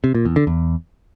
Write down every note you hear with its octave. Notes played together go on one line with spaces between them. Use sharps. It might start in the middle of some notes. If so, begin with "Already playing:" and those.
C3
A#2
E2
D3
E2